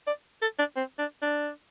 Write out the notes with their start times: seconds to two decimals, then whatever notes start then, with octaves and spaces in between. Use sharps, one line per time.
0.07 D5
0.42 A4
0.59 D4
0.76 C4
0.98 D4
1.22 D4